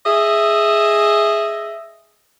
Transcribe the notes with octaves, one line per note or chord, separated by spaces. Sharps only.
G#4 D#5 E5